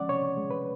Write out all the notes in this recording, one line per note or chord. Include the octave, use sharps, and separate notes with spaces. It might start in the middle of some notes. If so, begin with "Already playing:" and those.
Already playing: F3 G#3 C#4 D5 F#5
C3 C#5
G#3
B4